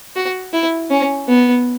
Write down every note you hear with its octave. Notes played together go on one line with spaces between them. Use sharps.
F#4
E4
C#4
B3